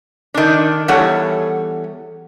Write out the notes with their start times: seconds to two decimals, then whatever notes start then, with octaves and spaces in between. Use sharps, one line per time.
0.34 D#3 D4
0.88 E2 G3 A4 C#5 F#5